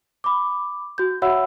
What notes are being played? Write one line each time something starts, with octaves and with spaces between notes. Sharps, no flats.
B5 D6
F#4 G6
F#4 C#5 E5 F#5 B5 E6